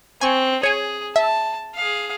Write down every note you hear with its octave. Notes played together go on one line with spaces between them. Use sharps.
C4 G#5 C#6
G#4 C#5 G#5
E5 A5
G#4 F5